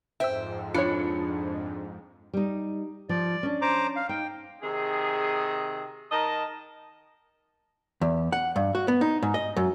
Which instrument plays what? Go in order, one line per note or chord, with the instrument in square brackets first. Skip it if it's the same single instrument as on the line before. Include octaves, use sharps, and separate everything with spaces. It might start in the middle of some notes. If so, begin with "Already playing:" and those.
[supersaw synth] F2 G#2 [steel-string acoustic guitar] C5 G5 [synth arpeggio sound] E5 E6
[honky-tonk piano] F3 B5 C#7 [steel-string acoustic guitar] D4 [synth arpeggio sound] F4 C#5
[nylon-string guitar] G3 D#4
[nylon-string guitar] F3 [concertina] D5
[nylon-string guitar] C#4 D4
[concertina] C5 A#5 D6
F5
[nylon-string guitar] D#4 [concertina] G5
[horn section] C3 D#3 G#4
D#3 A#4 D#5 A5
[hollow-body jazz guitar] E2
F#5
G2
F#4
B3
D#4
G#2
D#5
F#2